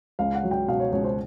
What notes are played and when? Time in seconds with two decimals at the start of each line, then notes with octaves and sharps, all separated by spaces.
0.19 C#2 F5
0.35 F#5
0.43 F#3
0.51 G5
0.68 B2 F5
0.80 C#5
0.92 C#2 C#5
1.04 C5